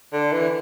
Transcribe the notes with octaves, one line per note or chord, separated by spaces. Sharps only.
D3
E3